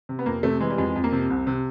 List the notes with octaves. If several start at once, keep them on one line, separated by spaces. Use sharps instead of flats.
C3
B3
F2 A#3
C3 A3
E3 G#3
G3
F2 G#3
F2
A#3
C3
C2
C3